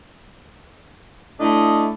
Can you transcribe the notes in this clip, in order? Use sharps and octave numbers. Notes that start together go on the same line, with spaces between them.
A3 D4 E4 D#5